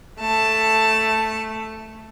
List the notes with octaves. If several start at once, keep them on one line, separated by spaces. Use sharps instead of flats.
A3 A5